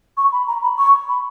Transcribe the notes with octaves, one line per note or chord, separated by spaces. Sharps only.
C#6
B5
A#5
B5
C#6
B5